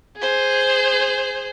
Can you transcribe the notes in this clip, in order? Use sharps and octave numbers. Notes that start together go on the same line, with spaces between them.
G#4 C5